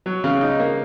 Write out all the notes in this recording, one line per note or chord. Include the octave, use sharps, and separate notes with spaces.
F#3
C#3
D#4
A#3